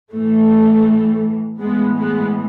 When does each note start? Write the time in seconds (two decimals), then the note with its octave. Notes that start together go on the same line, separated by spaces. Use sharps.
0.12 A2 E3 A3
1.60 A2 E3 G#3 B3
1.97 G#3 B3